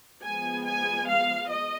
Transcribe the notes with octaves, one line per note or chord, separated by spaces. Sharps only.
F3 G#3 B3 G#5
G#5
F5
D#5